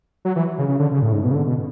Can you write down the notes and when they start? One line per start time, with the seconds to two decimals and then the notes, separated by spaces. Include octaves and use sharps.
0.25 F#3
0.36 E3
0.58 C#3
0.68 C#3
0.79 D3
0.91 C#3
1.02 A2
1.12 G#2
1.24 B2
1.31 C#3
1.35 D3
1.46 B2